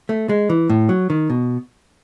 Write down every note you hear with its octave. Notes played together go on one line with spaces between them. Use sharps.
A3
G#3
E3
A2
F#3
D#3
B2